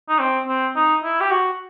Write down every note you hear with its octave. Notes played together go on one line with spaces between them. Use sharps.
D#4
C4
C4
D#4
E4
G4
F#4